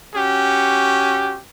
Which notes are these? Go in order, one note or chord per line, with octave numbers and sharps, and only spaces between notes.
C#4 F#4 G4